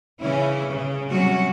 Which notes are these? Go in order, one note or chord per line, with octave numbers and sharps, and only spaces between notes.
C#3 E3 C#4 E4
C#3
C3 F#3 G3 C#4 F#4